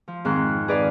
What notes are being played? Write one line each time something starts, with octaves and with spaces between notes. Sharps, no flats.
F3
F2 G#2 D#3 C6 F#6
G#4 B4 D5 D#5 F5